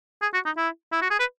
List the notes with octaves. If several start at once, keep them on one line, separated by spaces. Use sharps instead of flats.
G#4
F#4
D#4
E4
E4
F#4
G#4
B4